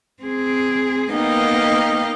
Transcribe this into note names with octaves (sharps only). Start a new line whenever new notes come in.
C4 G#4
A#3 B3 D#4 D#5 F5 G5